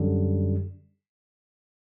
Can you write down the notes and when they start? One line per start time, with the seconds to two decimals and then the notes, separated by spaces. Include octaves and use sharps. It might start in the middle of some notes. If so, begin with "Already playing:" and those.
Already playing: F#2 D3 G3